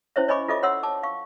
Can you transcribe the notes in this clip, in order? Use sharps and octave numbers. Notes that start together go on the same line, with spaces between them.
C#4 E4 C5 C#5 E5
C#5 D#5 G#5 B5 C#6 D6
F4 A4 D#5 E5 D6
C#5 F#5 C6 E6
A5 D6
F5 C#6